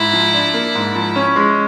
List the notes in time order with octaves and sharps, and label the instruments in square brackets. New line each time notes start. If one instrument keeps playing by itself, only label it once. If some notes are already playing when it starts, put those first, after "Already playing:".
Already playing: [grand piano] G#2 [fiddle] E4
[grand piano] F3
D4
A#3
G#2
F3
C#4
G#3